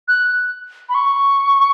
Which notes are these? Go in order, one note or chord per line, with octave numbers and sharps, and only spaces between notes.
F#6
B5
C#6